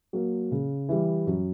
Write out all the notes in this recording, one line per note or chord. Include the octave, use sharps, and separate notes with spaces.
F#3 A#3
C#3
E3 G3
F#2